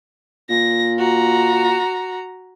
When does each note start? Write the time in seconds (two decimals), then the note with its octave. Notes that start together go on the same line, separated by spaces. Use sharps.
0.50 A#2 A#6
0.98 F#4 A#5